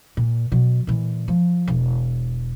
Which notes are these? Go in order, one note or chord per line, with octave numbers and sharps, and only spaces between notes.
A#2
B2 F#3
A#2 E3
F3
E1